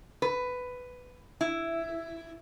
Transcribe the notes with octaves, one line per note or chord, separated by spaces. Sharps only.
B4
E4